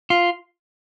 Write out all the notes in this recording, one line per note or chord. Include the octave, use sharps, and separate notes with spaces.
F4